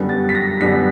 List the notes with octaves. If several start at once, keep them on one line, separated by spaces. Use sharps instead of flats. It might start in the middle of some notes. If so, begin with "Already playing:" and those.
Already playing: F#2 D3 G3 B3
A6
B6
A#6
F#2 D3 G3 B3 B6